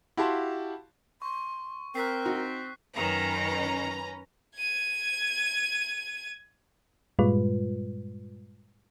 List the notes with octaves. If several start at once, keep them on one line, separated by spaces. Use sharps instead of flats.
E4 F#4 G4 F5 A5 C6
C6 C#6
C4 A#4 F#6 B6 C7
D#4 F#4
F#2 D#3 C#4 B4 A#5
G#6 D#7
G2 A#2 G3 G#3 F4 B4